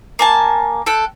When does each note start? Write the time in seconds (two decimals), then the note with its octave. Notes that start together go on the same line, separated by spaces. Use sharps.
0.19 A#3 G#5 A5
0.86 A4 G5 F#6